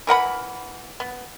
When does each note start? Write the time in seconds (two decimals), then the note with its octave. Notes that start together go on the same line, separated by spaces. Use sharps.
0.07 E3 A#4 F#5 B5
1.00 B3